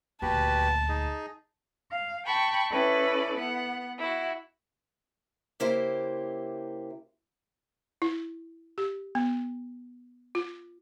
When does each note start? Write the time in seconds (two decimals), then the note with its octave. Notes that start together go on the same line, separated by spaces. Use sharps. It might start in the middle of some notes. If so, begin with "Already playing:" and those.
0.22 D#1 D2 F#4 G4 B4 A5
0.89 D#4 G#4
1.90 F5
2.25 G5 A5 B5 C#6
2.71 C#4 E4 A4 B4 D5
3.38 B3 F#5
3.98 E4 F#4
5.60 C#3 A#3 E4 G4 C5
8.02 E4
8.78 G4
9.15 B3
10.35 F4